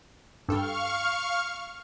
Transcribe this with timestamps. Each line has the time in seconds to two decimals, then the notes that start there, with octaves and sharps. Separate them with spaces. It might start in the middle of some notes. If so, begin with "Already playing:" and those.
0.49 G2 A4 F5 G5 C#6 F6